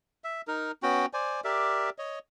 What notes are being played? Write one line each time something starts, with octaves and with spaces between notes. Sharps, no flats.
E5
D#4 A#4
B3 C#4 F#4 G5
C5 D5 G#5
G4 A#4 D5 E5
C#5 D#5